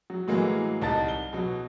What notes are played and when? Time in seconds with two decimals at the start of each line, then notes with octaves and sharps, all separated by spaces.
0.10 F#3
0.27 A2 E3 F#3 G#3 A#3 G#4
0.82 C2 D#4 A5 A6
1.08 G7
1.33 B2 F#3